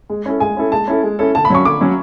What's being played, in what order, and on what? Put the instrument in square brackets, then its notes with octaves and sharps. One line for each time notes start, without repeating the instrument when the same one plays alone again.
[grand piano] G#3
C#4 E4 A4
[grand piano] G#3 [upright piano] G#5
[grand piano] C#4 E4 A4
[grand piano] G#3 [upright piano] A5
[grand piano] C#4 E4 A4
G#3
C#4 E4 A4
[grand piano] D3 [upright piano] A5
[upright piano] B5
[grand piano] F#3 C#4 [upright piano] C#6
[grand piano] D3 [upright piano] D6
[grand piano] F#3 C#4